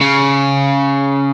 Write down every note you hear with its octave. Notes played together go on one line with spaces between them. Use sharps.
C#3